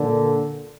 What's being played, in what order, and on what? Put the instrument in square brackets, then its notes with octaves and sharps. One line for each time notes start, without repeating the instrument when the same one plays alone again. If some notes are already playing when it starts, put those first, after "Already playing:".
Already playing: [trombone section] A#2 D3